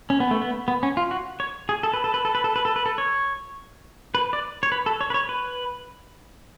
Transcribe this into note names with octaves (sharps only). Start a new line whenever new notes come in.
C#4
B3
A3
B3
B3
C#4
F4
F#4
C#5
G#4
A4
B4
A4
B4
A4
B4
A4
B4
A4
B4
A4
C#5
B4
D5
C#5
B4
A4
C#5
B4
C#5
B4